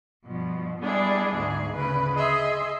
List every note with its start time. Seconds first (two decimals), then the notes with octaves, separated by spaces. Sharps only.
0.24 G2 B2 F3
0.80 G3 G#3 B3 D4 E4 G#4
1.35 D2 G#2 G#4
1.75 D2 C#3 B4
2.14 G#4 D#5 E5 C6